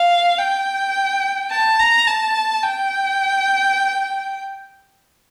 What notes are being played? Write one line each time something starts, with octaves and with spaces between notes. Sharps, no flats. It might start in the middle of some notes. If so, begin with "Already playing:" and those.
Already playing: F5
G5
A5
A#5
A5
G5